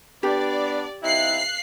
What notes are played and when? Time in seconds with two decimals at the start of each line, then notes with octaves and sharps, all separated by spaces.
0.23 B3 D4 G4 D5
1.02 C3 D#4 E4 F5 F#6 C7